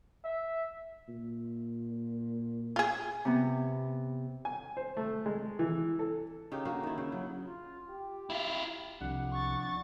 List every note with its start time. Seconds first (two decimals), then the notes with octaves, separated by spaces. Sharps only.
0.24 E5
1.09 A#2
2.76 F4 G#4
3.25 C3 B3
4.45 G#5
4.77 C5
4.97 A3
5.26 G#3
5.59 E3
5.99 A4
6.52 C#3 D#4 G4
6.65 D3 A#3 F#4 A#4
6.83 D#3 E4
6.98 C#3
7.12 F#3
7.47 F4
7.90 G4
8.30 E4 F4
9.01 C2 F3 D4 F#5
9.33 C#6 A6